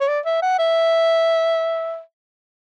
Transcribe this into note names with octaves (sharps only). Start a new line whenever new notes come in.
C#5
D5
E5
F#5
E5